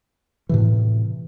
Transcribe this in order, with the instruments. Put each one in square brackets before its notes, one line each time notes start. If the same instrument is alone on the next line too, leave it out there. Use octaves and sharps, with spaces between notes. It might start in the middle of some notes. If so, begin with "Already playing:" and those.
[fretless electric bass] A2 C3 E3